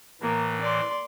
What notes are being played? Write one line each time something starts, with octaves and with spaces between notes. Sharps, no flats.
A2 E3 A#3
D5 C6